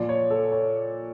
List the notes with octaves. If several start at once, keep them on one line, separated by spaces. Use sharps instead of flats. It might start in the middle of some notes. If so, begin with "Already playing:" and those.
Already playing: A#2 F3 D5
C#5
A4
C#5